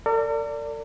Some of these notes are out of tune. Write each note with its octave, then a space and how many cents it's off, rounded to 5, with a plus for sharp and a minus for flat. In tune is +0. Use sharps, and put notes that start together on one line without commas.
A#4 -45 D5 -15